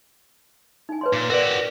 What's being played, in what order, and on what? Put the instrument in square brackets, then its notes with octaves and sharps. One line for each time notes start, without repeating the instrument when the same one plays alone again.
[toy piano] D#4 G#5
B4 C#5 C6
[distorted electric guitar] A#2 [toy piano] D6
[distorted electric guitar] F#4 G4 [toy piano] A#4 B4 D5